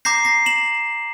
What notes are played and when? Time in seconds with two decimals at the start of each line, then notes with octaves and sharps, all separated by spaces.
0.05 A#5 D6 G6 A#6 C7
0.25 A#6 C7
0.46 E7 F#7